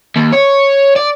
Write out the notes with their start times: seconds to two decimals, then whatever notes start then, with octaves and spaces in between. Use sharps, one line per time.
0.16 D#2
0.33 C#5
0.96 D5